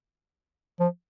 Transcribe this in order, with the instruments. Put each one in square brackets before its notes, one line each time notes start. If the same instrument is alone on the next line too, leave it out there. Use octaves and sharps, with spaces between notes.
[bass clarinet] F3